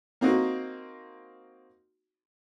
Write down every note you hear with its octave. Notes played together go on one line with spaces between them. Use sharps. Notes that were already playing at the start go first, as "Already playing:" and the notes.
A#3 C4 D#4 F#4